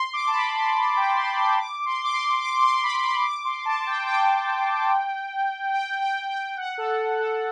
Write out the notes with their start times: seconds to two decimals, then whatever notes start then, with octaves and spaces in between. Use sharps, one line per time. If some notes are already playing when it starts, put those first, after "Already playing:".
Already playing: C6
0.13 D6
0.27 A5
0.33 B5
0.54 C6
0.75 C6
0.96 G5
1.16 C6
1.37 C6
1.59 D6
1.85 C6
2.04 D6
2.13 C6
2.41 D6
2.62 C6
2.83 B5
2.96 B5
3.03 C6
3.24 D6
3.45 C6
3.65 A5
3.86 G5
4.07 G5
5.73 G5
6.01 G5
6.28 G5
6.57 F#5
6.78 A4
7.19 A4